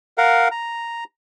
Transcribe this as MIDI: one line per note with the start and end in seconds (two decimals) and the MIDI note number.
0.18 0.48 70
0.18 0.48 77
0.18 0.48 78
0.52 1.04 82